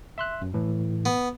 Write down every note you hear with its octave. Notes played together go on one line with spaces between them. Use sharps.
E5 C6 F#6
F#2
A2 E3
B3